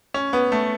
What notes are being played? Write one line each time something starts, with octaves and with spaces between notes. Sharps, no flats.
C#4
B3
A3